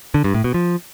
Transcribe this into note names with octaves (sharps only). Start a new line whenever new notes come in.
D3
G2
A2
B2
F3